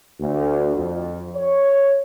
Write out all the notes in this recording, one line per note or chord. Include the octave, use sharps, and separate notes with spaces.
D2
F2
C#5